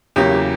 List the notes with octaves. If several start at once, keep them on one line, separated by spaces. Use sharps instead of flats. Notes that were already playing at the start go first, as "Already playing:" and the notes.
E2 C#3 F#3 A#3 G4